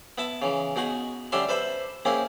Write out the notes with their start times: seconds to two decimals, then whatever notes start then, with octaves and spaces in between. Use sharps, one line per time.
0.18 B3 E4 A5
0.42 C#3 E3
0.76 B2 D#4 G#4 F#5 C#6
1.32 D3 G3 C#4 D4 E5 C6
1.49 A4 B4 C5 E5 B5
2.05 A#3 C4 C#4 E4 G#4